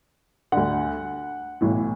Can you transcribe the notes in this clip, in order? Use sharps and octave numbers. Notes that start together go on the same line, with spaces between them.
D2 D3 F#5
B1 A2 E3